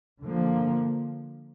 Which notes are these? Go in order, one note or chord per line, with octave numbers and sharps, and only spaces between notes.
D3 F3 A#3